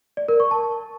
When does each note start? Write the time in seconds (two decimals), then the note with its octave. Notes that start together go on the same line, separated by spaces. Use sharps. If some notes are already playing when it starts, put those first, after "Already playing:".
0.17 D5
0.28 A#4
0.40 C#6
0.51 A5